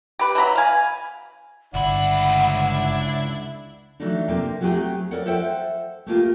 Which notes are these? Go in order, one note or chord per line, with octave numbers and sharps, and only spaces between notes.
G4 B4
E3 F#3 A#5 B5
F5 G#5
G1 C#2 D4 E4 F#5 B5
E3 F#3 A3 D4 D#4
C3 A#3 C4 A4 A#4
F#3 A3 C4 G4 G#4
A4 A#4 C#5 D5 F#5
A4 C5 E5 F#5 G5
A3 A#3 F4 G4